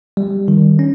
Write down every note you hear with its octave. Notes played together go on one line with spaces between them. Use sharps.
G3
D#3
C#4